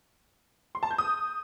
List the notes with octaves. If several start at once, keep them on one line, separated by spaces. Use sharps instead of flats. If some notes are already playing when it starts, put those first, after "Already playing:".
C6
A5
G6
D#6